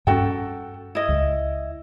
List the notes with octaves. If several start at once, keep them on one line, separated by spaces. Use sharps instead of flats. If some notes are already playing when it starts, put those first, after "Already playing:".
G2 C#4 F#4 A4 G5
E4 D#5
C#2